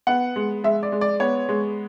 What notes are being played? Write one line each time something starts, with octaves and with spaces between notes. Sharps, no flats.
B3 F#5
G#3
G#3 E5
D5
G#3
D5
B3 C#5
G#3